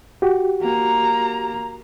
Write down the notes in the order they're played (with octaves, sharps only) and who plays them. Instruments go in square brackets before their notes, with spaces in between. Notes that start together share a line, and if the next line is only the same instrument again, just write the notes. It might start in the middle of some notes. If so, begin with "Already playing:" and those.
[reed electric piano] F#4 G4
[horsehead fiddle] A#3 A#5